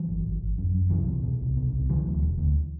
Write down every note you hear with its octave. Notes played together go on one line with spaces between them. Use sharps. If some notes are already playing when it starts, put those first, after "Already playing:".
Already playing: E3 F#3
G#1
G#1
G#1
F#2
F#2
C2 E3 F#3
B2
B2
C2
B2
C2
D3 E3 F#3
D2
E1
D2